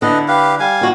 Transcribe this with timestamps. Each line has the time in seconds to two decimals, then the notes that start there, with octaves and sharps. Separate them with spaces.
0.02 D3 E4 A4 B4 D#5
0.28 G4 B4 F5
0.60 G3 F5 G#5
0.81 D#3 F#4